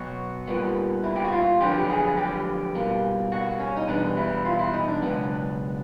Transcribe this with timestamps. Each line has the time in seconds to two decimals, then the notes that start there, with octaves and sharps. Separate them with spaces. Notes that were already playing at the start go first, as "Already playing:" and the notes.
Already playing: B2 F#3 B3 F#4
0.47 A#2 G3 B3
1.04 E4
1.16 G4
1.25 F#4
1.32 F4
1.61 F2 D3 F#3 B3 G4
1.78 G4
1.90 G#4
2.17 G4
2.75 B2 G3 A#3
3.32 F#4
3.60 C#4
3.77 D#4
3.88 E2 B2 G3 B3 D4
4.17 E4
4.45 F4
4.59 E4
4.73 D#4
4.88 D4
5.02 C#2 B2 F#3 B3